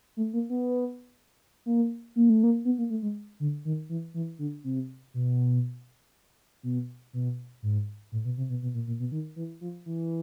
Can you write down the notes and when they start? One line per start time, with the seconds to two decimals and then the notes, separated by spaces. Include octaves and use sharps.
0.17 A3
0.33 A#3
0.50 B3
1.66 A#3
2.16 A#3
2.29 A3
2.43 A#3
2.65 B3
2.78 A#3
2.90 A3
3.02 G#3
3.40 D3
3.65 D#3
3.89 E3
4.14 E3
4.39 D3
4.64 C3
5.14 B2
6.63 B2
7.13 B2
7.62 G#2
8.12 A2
8.25 B2
8.37 C3
8.49 B2
8.62 B2
8.74 A#2
8.87 A#2
8.99 B2
9.12 D#3
9.36 E3
9.61 F3
9.86 E3